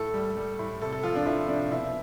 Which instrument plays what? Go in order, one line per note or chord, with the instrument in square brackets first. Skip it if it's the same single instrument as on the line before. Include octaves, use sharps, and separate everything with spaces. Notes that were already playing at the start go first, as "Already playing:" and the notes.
Already playing: [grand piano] A2 A4
G3
G3
A2
C3 A4
A4
F3 F4
D4
F3 E4
C3 D4
B2 E4